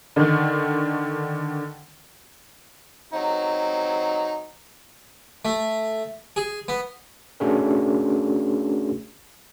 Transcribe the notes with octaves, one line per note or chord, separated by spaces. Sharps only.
D3 D#3
F#3 C4 D#4
A3
G#4
B3
A3 C#4 D4 F#4 G#4 A#4